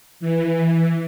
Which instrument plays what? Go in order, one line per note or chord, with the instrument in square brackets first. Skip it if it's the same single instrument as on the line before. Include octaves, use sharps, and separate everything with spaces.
[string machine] E3